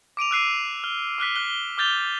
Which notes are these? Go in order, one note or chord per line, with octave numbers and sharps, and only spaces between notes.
D6 D7 D#7 F7
E6 F#6 C7 D#7
F6
D6 F6 F#6 B6
F6 F#6 G7
D6 F6 G6 A6 F7 G7